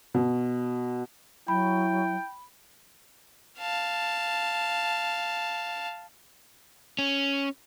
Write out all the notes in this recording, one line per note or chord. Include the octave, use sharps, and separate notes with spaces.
B2
F#3 E4 G5 B5
F5 A5
C#4